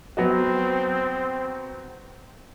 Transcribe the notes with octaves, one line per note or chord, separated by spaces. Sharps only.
F#3 B3 C4 F#4